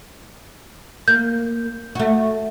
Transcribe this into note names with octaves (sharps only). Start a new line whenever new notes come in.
A#3 G6
A3 F#4